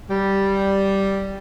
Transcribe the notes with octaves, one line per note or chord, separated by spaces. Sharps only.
G3